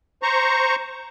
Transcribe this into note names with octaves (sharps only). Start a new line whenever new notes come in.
C5 A#5 C#6